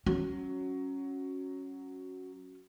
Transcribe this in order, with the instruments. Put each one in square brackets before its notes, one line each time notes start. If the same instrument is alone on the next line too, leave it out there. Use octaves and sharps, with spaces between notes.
[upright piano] F#3 [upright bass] C#4